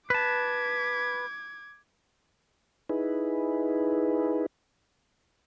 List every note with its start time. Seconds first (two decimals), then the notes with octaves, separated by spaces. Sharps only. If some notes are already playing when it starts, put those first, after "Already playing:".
0.10 B4 A5 D6 G#6
2.89 D#4 E4 G#4 B4